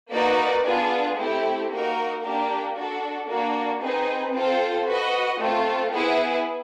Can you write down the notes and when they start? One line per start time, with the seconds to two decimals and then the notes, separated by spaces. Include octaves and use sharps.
0.12 A#3 D#4 F#4 B4 D5
0.65 B3 D4 F4 G#4
1.18 A3 C4 E4 G4
1.70 A#3 D#4 F#4 A#4
2.23 A#3 D4 G4 A#4
2.76 D4 F#4 A4
3.28 A#3 D4 F#4
3.81 C4 D#4 G#4 B4
4.33 C4 F4 A4 C5
4.86 F#4 B4 D#5
5.39 A3 C4 F4
5.91 B3 E4 G#4